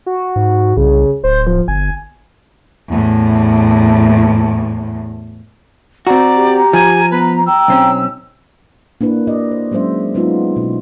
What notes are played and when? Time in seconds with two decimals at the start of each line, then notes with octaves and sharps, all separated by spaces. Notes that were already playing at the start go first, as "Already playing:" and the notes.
0.06 F#4
0.36 G#2
0.77 C2 C#3
1.24 D1 C5
1.47 F3
1.68 G1 G#5
2.89 E2 A2
6.07 C4 F#4 D5 A#5
6.36 G4
6.73 F3 G#5
7.11 B3 B4
7.47 G5 A#5 E6
7.68 B1 C4 C#4
9.01 A#3 D4 E4 B4
9.27 F#4 D5 D#5
9.51 C5
9.72 F#3 G#3 C#4 C5 E5
10.14 F#3 G#3 B3 C#4 D#4 F4
10.56 B2